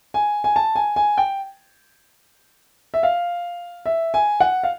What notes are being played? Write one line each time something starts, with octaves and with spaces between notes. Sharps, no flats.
G#5
G#5
A5
G#5
G#5
G5
E5
F5
E5
G#5
F#5
F5